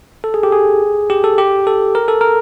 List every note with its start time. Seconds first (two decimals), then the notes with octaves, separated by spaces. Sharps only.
0.24 A4
0.34 G#4
0.43 G4
0.52 G#4
1.10 G4
1.24 A4
1.38 G4
1.67 A4
1.95 A#4
2.08 A4
2.21 A#4